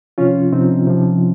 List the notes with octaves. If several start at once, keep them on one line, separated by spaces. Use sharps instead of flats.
C3 F3 C#4 F4
C3 F3 C4 D#4
C3 F3